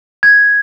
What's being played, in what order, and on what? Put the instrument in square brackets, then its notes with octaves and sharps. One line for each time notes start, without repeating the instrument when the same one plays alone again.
[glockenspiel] G#6